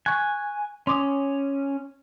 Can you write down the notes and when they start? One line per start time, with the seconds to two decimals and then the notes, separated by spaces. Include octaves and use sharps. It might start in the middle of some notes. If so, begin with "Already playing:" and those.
0.06 G#5 C#6 F#6
0.87 C#4 C6 D6 D#6